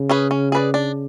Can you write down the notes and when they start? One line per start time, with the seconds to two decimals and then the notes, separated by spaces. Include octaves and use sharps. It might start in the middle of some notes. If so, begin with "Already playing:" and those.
Already playing: C#3
0.09 C#4 G#4 B4
0.31 C#4
0.52 G#4 B4 D5
0.74 D4